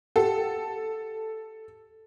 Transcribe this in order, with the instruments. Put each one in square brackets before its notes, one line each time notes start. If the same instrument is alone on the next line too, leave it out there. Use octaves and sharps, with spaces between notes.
[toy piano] G4 F#5 G5 [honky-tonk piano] A4